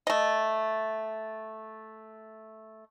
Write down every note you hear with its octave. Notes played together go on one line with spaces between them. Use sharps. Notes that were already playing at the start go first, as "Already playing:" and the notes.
A3 D#5